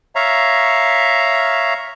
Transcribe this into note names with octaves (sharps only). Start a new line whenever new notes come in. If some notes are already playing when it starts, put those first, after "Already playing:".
C#5 E5 F5 A#5